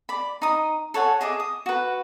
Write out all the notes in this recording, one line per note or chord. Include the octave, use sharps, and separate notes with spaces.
D5 B5
D#4 D#6
A4 C#5 F#5 G#5
G#4 D#5 E5 D6
D#6
F#4 B4